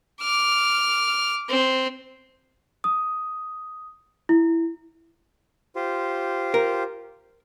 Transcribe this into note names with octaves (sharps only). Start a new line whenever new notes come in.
D6 F6
C4
D#6
E4
F4 G4 C5
A#4